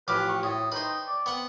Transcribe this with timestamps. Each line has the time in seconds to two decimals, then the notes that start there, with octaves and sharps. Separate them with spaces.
0.08 A1 F3 B4 G5 G#5 D6
0.28 F#4 G4 C5 C#6
0.43 A2 E4 A4 C#5 D#6
0.72 D#4 B4 C5 D#5 G5
1.07 D5
1.26 B3 C4 F#5